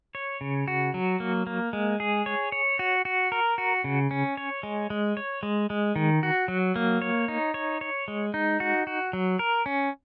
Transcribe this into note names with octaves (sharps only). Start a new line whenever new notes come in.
C#5
C#3
F#4
F#3
A#3
A#3
G#3
G#4
C#5
C#5
F#4
F#4
A#4
F#4
C#3
C#4
C#5
G#3
G#3
C#5
G#3
G#3
D#3
F#4
F#3
A#3
C#5
D#4
C#5
C#5
G#3
D#4
F#4
F#4
F#3
A#4
C#4